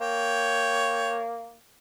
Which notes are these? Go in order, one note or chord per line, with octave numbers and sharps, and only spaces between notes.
A#3 C#5 G5